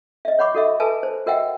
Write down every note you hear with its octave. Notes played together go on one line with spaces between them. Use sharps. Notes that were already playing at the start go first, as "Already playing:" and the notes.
D#5 E5
C#5 F#5 B5 C#6 D6
F#4 A4 D#5 E5
A4 B4 E5 G#5 A5
C5
F#4 A#4 D#5 E5 F#5 G5